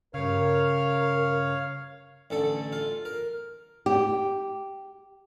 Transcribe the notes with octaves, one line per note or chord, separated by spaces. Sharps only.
G2 C#3 A#4 C#5 F5 F6
A1 D3 A4
F4
A#4
G4